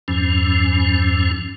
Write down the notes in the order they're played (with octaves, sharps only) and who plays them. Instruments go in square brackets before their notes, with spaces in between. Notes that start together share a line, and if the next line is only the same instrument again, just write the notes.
[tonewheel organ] E2 G2 F3 C#4